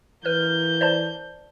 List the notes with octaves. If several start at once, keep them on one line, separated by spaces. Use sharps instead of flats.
E3 A#3 B4 F6 G6
C5 D5 A5